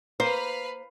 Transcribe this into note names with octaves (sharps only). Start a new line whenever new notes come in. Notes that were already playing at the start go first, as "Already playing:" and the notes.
A#3 B4 C5 F5